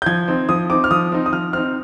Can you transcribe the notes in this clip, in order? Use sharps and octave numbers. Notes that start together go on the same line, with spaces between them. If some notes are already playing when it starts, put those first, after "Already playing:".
G6
F3 G#6
C4 D#4
F3 D#6
C4 D#4 D6
F6
F3 D#6
C4 D#4
D#6
F3 F6
C4 D#4 F6